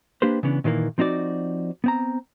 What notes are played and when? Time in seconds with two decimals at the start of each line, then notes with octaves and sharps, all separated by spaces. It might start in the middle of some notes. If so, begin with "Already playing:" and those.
0.22 A#3 D4 G4 B4 C5
0.43 C#3 E3 B3 C#4 D4
0.64 A#2 D#3 E3 G3 A#3
0.98 F3 C4 D#4 F#4 D5
1.84 B3 C4 A#5